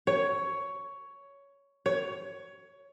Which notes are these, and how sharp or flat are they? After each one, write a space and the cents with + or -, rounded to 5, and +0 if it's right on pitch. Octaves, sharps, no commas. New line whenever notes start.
C#5 +10
C#5 +15